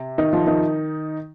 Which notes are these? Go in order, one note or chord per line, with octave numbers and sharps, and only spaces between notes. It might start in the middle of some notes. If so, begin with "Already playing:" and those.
Already playing: C3
D#3 D#4
F3 F4
D#3 D#4